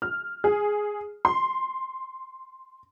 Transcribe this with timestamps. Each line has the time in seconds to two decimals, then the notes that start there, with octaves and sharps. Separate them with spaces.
0.02 F6
0.44 G#4
1.25 C6